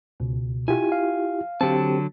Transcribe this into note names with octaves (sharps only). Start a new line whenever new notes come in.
C#2 B2
E4 F4 G4 G#5
F5
D3 F#3 C4 G4 A5